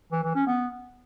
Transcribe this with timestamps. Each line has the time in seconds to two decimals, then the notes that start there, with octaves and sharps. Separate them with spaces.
0.12 E3
0.24 E3
0.35 C#4
0.47 B3